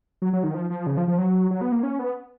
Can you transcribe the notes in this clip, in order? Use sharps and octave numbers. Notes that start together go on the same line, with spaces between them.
F#3
F#3
D#3
F3
F3
C#3
F3
F3
F#3
F#3
B3
A#3
C#4
B3